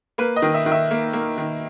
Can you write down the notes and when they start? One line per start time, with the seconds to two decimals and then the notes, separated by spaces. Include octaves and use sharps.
0.18 A#3 B4
0.36 D#5
0.42 D#3
0.54 E5
0.66 D#3
0.72 E5
0.91 A#3
1.13 A#3
1.38 D#3